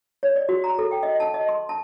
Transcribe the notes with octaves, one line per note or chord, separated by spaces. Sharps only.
C#5
D5
F#4
A#5
A4
G5
D#5
A5
D#5
C6
A5